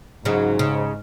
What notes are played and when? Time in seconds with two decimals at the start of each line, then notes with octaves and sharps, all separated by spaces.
0.25 G#2 C#3 F#3
0.59 C#3